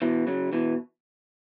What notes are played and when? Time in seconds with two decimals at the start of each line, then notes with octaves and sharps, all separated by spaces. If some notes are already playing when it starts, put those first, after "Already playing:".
0.02 B2 E3
0.27 C#3 F#3
0.53 B2 E3